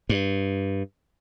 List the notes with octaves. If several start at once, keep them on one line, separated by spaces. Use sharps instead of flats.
G2